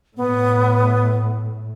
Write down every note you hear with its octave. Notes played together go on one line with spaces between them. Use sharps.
A2 B3